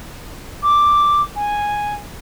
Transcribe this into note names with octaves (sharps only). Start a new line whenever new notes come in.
D6
G#5